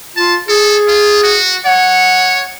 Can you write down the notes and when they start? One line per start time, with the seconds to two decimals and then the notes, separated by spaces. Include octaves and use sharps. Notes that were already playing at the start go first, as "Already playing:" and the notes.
0.16 F4 A5
0.48 G#4 A4
0.88 F4
1.24 F#4
1.65 C#5 F#5